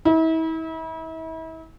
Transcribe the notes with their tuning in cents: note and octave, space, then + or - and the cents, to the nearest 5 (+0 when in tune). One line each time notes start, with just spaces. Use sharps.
E4 -40